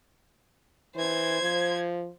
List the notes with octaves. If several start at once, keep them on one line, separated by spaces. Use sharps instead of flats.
E3 C5 G#6
F3